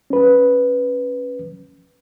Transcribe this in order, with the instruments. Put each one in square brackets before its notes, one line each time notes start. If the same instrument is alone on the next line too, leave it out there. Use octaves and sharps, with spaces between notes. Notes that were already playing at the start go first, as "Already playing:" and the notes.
[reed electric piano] C#4 B4